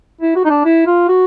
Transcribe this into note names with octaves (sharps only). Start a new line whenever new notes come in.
E4
F#4
D#4
D4
E4
F4
F#4